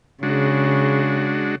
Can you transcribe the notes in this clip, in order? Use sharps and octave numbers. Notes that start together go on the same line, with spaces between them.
C#3 G#3 D4 F#4